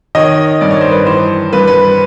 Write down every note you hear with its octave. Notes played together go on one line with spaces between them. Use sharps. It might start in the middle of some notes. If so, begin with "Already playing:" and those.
D#3 C#5 D#5
G2 D5
C#5
C5
B4 C#5
E3 C5
G2 B4
B4